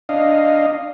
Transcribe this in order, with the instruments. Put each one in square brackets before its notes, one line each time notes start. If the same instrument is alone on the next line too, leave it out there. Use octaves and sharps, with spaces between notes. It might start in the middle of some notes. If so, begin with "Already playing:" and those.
[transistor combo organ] D4 D#5 F5